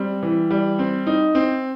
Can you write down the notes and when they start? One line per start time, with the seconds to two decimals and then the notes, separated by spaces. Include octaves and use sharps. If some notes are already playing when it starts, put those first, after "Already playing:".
Already playing: G3 C4
0.23 E3
0.50 G3
0.79 C4
1.07 D#4
1.35 C4